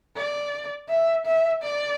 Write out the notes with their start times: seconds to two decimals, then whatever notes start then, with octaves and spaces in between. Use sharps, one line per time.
0.16 D5
0.89 E5
1.26 E5
1.63 D5